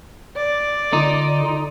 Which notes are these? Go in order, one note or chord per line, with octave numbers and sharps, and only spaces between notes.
D5
D3 D#4 F4